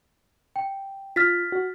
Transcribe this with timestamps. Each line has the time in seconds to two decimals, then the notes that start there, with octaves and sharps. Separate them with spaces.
0.56 G5
1.16 F4 F6 A6 B6
1.52 F#4